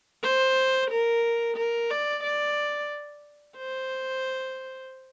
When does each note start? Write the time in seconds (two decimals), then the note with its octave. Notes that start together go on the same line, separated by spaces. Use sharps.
0.23 C5
0.90 A#4
1.57 A#4
1.90 D5
2.23 D5
3.57 C5